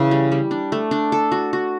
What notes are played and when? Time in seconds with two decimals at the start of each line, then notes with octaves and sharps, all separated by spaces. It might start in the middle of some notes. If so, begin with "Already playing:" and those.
Already playing: C#3 E3
0.11 G3
0.32 G3
0.51 D4
0.72 A3
0.91 D4
1.12 A4
1.32 F#4
1.53 F#4